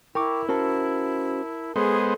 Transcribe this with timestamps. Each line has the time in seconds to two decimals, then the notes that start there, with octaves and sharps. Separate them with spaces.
0.15 E4 A#4 G5 C#6 D6
0.49 C#4 F#4 A#4 C5 A5
1.76 G#3 B3 G#4 A4 C5